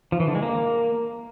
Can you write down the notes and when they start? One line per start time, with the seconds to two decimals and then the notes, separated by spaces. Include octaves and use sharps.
0.12 F3
0.20 E3
0.27 D3
0.35 G#3
0.43 A#3